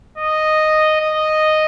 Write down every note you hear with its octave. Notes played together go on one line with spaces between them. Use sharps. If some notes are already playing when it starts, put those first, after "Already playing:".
D#5
D#5